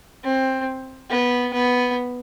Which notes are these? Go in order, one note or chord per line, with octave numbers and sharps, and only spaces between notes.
C4
B3
B3